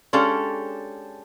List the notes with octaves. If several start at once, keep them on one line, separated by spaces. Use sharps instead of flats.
G#3 C#4 D4 G4 A4 F5